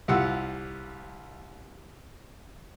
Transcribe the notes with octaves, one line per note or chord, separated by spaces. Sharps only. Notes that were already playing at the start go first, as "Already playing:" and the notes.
C2 F4 G4 F#5 E6